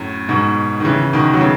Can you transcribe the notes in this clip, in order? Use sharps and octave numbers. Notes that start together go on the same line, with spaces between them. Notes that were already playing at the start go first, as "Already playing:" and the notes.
Already playing: F#2 A2
G#2 B2
D#3
C#3 E3
B2 D#3
F#3
C#3 E3